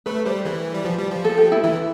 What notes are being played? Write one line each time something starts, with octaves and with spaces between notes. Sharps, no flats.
A3 B4
G3 C5
E3 B4
G3
F3
G3
F3
A4
G4
E4
E3 E4